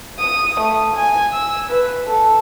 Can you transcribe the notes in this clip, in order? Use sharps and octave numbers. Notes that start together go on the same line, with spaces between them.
D#6
A3
G#5
E6
B4
A4